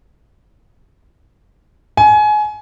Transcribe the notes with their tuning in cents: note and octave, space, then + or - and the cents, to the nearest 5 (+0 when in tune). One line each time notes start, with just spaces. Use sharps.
G#5 +25